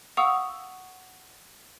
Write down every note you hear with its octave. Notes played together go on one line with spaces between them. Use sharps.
F5 F#5 C#6 D#6 E6 F7